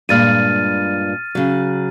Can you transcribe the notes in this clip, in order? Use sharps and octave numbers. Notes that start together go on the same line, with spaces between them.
G2 A#2 G#3 F6 A6 D#7
C#3 F#3